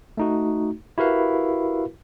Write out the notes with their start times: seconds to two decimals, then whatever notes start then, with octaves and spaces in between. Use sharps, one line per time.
0.17 A3 D#4 F#4
0.98 E4 F#4 G4 A#4 B4 F5